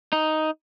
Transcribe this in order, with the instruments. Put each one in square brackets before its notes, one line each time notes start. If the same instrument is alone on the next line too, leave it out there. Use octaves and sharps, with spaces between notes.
[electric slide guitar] D#4